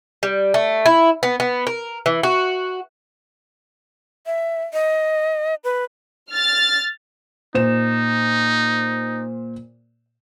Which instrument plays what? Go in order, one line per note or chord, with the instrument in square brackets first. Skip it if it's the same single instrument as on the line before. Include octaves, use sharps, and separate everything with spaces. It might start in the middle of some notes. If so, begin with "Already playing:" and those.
[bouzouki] G3
A3
E4
B3
B3
A#4
E3
F#4
[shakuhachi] E5
D#5
B4
[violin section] F6 A6
[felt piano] A#2 C5 E7 [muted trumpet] D#4